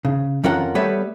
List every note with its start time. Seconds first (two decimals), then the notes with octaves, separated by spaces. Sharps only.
0.05 C#3
0.44 F2 D#3 C#4 F4 A#4 F#5
0.75 G3 A3 B3 B4 C#5 E5